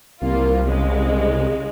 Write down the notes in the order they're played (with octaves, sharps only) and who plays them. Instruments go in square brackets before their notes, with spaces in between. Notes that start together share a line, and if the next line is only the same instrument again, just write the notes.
[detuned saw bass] C2 [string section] G3 A#3 F4
[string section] C#3 G#3